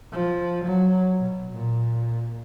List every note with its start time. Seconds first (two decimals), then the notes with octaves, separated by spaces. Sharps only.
0.12 F3
0.64 F#3
1.18 B2
1.51 A#2